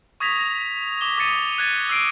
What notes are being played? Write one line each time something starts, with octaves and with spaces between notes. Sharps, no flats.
C#6 D#6 G#6 A#6 B6 F7
A#6
D6 G7
D6 D#6 A6 C#7 D#7
F#6 G#6 A6 D#7
E6 F#6 C7 D7